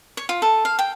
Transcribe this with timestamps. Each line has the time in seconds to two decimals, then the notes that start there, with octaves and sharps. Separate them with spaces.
0.17 C#5
0.29 F4
0.42 A4
0.65 F5
0.79 G5